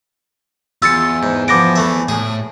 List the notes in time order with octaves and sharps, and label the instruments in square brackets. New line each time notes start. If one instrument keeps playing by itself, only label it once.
[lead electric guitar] E2 [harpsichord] F4 C6 [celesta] E6 A6 C#7
[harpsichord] G#2
[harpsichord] F3 B3 [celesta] D6 A#6 D7
[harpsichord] E3 A3 E5
[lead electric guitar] A2 [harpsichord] G#4